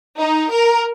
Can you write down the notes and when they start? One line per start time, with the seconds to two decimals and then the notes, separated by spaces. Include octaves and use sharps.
0.19 D#4
0.52 A#4